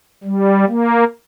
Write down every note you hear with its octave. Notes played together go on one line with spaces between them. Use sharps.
G3
A#3